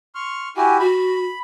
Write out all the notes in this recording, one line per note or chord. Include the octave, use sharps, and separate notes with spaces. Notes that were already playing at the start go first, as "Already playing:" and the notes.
C6 C#6 F6
E4 F#4 G4 G#5
F#4 B5